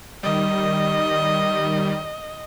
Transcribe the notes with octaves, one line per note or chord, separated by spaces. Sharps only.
D#3 G3 D#5